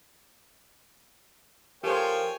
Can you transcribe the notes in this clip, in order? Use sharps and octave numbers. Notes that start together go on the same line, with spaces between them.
F3 G4 A4 A#4 C5 C#5 G5 G#5